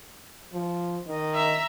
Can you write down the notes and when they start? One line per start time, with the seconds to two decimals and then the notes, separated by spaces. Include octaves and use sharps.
0.53 F3
1.06 D#3 D#5
1.35 E5 A#5